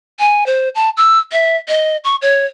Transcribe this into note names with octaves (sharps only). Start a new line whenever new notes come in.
G#5
C5
A5
E6
E5
D#5
C#6
C#5